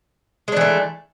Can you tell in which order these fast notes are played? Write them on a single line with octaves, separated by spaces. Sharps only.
G#3 D4 E3 A3